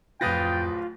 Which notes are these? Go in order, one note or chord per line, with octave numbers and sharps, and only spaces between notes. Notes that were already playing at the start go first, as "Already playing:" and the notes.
D1 F2 F4 B4 G5 D#6 A6 A#6